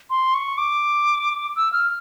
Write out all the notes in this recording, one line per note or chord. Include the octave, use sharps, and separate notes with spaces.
C6
C#6
D6
E6
F6